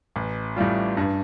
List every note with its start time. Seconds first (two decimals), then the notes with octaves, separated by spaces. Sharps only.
0.16 A1
0.56 A2 G3 F4
0.97 G2